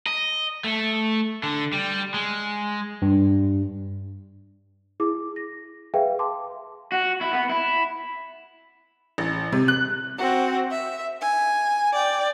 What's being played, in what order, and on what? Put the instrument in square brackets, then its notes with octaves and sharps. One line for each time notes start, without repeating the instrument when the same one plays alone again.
[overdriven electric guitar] D#5
A3
D3
G3
G#3
[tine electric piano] G2
[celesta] E4 G#4 D6
A#6
G#4 B4 E5 F5 G5
A5 C6 D6
[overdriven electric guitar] F#4
E4
B3
E4
[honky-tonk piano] A1
C3
F#6
[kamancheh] C4 F#4
E5
G#5
D5 G5